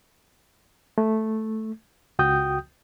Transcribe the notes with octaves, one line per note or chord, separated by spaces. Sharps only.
A3
C#2 F#4 G5 D#6 G6